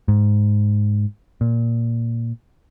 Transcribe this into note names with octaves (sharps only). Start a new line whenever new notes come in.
G#2
A#2